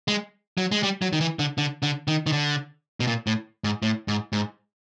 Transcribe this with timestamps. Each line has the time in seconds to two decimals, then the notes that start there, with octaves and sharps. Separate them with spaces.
0.08 G#3
0.58 F#3
0.72 G#3
0.83 G3
1.02 F#3
1.13 D#3
1.20 E3
1.39 D3
1.58 D3
1.83 D3
2.08 D#3
2.26 D#3
2.32 D3
3.00 B2
3.07 A#2
3.27 A2
3.64 G#2
3.82 A2
4.08 G#2
4.33 G#2